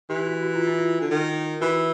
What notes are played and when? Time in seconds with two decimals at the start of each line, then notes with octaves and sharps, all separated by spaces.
0.10 E3 G4
0.27 F#4
0.43 F#4
0.55 F4
0.67 E4
0.78 F4
1.01 D3
1.10 D#3
1.61 E3 F#4